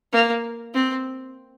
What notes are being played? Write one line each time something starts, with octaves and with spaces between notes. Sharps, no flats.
A#3
C4